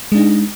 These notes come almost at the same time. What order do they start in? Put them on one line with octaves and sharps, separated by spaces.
G#3 D4 D#4